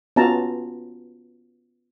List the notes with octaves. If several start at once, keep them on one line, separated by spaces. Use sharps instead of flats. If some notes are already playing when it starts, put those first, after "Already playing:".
B3 C#4 F4 F#4 A5 A#5